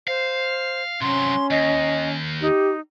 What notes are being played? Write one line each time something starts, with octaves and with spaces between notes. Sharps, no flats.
C5 F5
C3 F#3 C#4 C6
D#2 D#5
D#4 G4